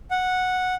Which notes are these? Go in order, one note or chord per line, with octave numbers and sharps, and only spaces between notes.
F#5